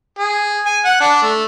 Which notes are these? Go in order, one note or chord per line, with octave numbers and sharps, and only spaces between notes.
G#4
G#5
F#5
D4
A3